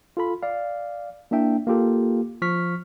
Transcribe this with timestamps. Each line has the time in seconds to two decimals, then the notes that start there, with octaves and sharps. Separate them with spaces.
0.17 F4 A4 B5
0.43 D5 F5
1.31 A#3 D4 E4 E5 G5
1.67 A#3 F4 G4 A4
2.42 F3 C#6 F6 B6